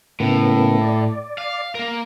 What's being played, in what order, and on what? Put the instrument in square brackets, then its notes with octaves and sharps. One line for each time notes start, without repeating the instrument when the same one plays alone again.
[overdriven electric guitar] A2 [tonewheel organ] C#3 A#3 B3
[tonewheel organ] D5
[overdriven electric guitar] F5
A#3 A#4